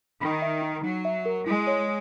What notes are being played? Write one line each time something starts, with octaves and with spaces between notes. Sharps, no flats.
D#3 B5
E5
D#4
F#3 D#4
E5
A#4
G#3 E4
C#5